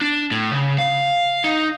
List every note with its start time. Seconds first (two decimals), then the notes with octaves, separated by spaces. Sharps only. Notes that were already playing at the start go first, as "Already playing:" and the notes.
0.01 D4
0.31 A2
0.51 C#3
0.78 F5
1.44 D#4